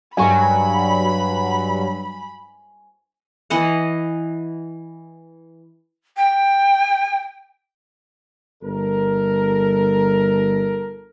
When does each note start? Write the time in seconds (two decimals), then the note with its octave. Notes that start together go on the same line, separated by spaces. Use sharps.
0.17 G2 F#3 G#5 B5 C#6
3.50 E3 D#5 F#5
6.17 G5
8.62 G1 A4 A#4